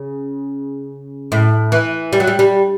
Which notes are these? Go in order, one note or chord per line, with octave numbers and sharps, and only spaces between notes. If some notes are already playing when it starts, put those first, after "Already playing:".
Already playing: C#3
A2
E3
G3
F#3
G3
G3